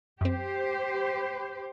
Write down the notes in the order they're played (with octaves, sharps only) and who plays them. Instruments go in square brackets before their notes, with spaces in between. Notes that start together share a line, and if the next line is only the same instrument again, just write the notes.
[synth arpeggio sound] F#2 C4 [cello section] G4 C5